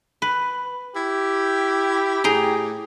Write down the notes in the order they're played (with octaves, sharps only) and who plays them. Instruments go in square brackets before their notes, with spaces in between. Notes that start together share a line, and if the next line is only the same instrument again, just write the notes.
[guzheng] B4
[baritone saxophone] E4 [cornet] G4
[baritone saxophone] A2 [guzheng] G#4 G5 A#5